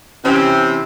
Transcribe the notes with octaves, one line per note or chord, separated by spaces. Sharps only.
C3 E3 C4 C#4